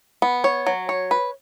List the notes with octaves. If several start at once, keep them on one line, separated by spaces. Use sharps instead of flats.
B3
C#5
F#3
C#5
B4